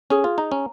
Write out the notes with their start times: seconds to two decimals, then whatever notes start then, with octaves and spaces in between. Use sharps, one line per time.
0.10 C#4 G#4
0.24 F4
0.38 D#4 A#5
0.52 C#4